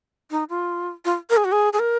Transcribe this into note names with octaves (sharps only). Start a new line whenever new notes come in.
D#4
F4
F4
A#4
G#4
F#4
G#4
G#4
A#4